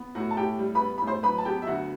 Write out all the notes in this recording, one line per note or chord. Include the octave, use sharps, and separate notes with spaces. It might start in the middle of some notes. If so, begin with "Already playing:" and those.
Already playing: B3
A2 F#4 F#5
A5
A2 G4 G5
G3
B4 B5
B3
A2 B5
C5 C6
F#3 B4 B5
A5
B3 G4 G5
E5
D2 F#4 F#5